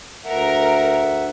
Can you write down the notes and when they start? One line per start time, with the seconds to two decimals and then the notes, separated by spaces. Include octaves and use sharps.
0.25 D2 A#4 E5 F#5